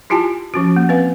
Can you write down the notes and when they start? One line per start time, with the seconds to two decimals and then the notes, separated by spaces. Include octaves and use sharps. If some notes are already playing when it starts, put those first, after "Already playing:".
0.10 E4 F4 G4 G#5 A5
0.54 F3 C#4 F#4
0.76 A#3
0.89 C4 B4 F5